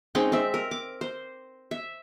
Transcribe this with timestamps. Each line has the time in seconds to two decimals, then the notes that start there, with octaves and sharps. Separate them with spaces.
0.15 G#3 C4 C#4 D#4
0.32 C4 E5
0.54 A#4
0.71 D6
1.01 C5
1.71 E5